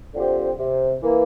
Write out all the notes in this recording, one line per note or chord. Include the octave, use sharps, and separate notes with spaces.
D3 F3 C4 G4
C3
E3 A#3